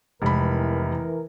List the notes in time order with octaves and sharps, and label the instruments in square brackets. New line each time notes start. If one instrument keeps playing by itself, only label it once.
[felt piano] F1 B5 [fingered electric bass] C3 G#3 [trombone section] E3 A#4